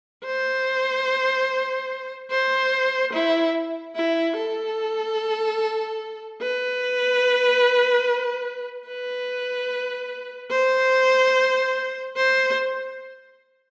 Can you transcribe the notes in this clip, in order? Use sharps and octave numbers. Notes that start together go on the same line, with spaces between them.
C5
C5
E4
E4
A4
B4
B4
C5
C5